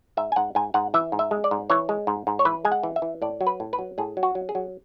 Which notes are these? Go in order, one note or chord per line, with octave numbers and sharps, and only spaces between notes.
G#2 E5
G#5
G#2 F#5
G#2 G#5
G#2 F#5
E3 E5
G#2
E5
G#3
D5
G#2
E3 C#5
G#3
G#2
G#2
C#5
E3 B4
G#3 G#5
F#5
E3
E5
E3
A2 D5
F#3
B4
A2
B4
F#3
A2 G#4
F#3
F#4
F#3
G#4
F#3